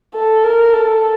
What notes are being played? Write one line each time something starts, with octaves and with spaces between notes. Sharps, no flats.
A4
A#4
A4